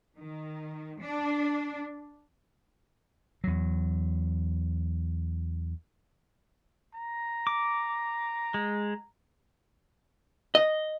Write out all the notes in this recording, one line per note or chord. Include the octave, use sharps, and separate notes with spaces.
D#3
D4
E2 F#3
A#5
D6
G#3
D#5